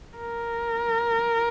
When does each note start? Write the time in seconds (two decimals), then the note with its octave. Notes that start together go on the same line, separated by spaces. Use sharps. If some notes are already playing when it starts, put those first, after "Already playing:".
0.18 A#4